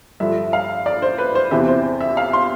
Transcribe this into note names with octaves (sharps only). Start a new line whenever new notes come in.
G2 D3 F3 E5
F5
D5
C5
B4
C5
E2 C3 E3 E5
C5
E5
F5
C6